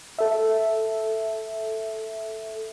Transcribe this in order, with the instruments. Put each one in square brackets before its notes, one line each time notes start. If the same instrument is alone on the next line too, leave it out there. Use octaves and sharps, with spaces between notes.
[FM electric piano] A4 E5